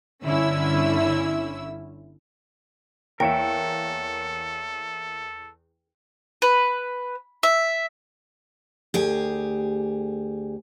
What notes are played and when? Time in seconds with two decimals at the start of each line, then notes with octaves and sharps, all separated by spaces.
0.24 G1 D3 C#4 E4 E5 E6
3.20 E2 A#3 A4 A#4 C#5 E5 G5
6.42 B4
7.43 E5
8.94 D2 G4 G#4